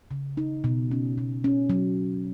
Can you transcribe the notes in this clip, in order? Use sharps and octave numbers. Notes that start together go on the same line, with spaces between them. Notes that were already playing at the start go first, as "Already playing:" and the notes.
C#3
D#4
B2
C#4
B2
C#4
F#3